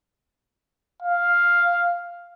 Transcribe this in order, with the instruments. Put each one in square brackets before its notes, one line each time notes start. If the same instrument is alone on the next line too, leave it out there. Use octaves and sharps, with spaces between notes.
[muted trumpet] F5